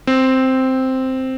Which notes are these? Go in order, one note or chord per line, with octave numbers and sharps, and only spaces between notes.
C4